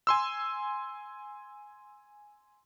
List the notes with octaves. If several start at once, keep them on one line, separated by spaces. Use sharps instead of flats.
G#5 C6 E6